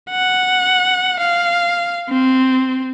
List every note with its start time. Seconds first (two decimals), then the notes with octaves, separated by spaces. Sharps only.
0.11 F#5
1.19 F5
2.09 C4